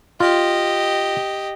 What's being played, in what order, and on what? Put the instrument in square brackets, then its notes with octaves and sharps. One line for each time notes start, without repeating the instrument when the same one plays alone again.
[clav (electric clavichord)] F4 [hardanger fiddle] G4 D#5